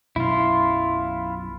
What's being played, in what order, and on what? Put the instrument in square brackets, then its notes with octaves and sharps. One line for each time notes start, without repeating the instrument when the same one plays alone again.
[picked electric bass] B1 F#2 B2 [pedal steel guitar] E4 F4